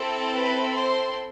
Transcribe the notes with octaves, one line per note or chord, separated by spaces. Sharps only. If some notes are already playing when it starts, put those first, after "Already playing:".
Already playing: C4 E4 A4
B4 B5
C5 C6